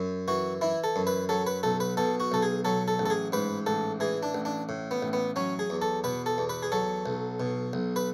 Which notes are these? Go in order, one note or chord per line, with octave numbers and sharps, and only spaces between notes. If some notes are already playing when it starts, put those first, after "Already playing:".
Already playing: F#2
E3 F#4
E3 E4
A4
F#2
B4
F#3 A4
B4
B1 A4
B4
B2 A4
F#4
B1 A4
G#4
F#3 A4
A4
A1
A4
G#4
G#2 B4
A1 A4
E3 G#4
D4
A1
D4
A2
B3
A1
B3
F#3 C#4
G#4
E2
A4
B2 B4
A4
E2
B4
G#4
F#3 A4
B1
B2
B1
B4